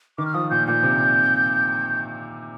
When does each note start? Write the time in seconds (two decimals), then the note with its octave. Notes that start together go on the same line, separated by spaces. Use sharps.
0.18 D#3 D6
0.26 F6
0.34 F3 D#6
0.50 A#2 G6
0.67 A#2 G6
0.83 C3